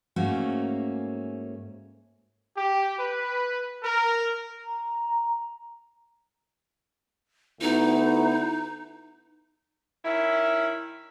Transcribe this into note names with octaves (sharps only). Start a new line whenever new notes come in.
G#2 A3 A#3 C#4 F#4
G4
B4
A#4
A#5
D2 B3 D#4 E4
D#3 C#4 E4